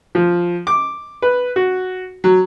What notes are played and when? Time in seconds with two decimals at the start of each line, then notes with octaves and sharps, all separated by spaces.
0.15 F3
0.67 D6
1.22 B4
1.56 F#4
2.24 F#3